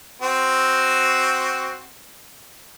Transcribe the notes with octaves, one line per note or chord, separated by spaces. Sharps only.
C4 F#4 C5